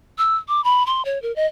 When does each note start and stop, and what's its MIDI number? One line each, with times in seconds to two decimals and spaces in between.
0.18 0.36 88
0.48 0.63 86
0.64 0.86 83
0.86 1.02 84
1.05 1.21 73
1.22 1.34 70
1.36 1.46 75